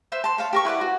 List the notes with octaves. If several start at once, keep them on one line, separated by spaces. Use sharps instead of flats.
B4 C5 E5
A5 C6
C#5 F5 A5
G4 A#4 C#6
E4 B4 D5 F#5
F#4